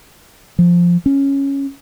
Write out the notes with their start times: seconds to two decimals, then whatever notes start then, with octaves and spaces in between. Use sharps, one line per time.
0.59 F3
1.06 C#4